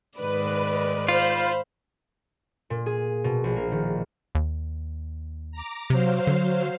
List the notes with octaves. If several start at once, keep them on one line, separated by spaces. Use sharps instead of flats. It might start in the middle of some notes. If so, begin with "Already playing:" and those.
G#2 D#3 B4 D5
F4 C5 F5 B5
A#2
G#4
B2
A#1
A#3
D#3
D#2
A#5 D6
C3 F#3 C5 F5
D3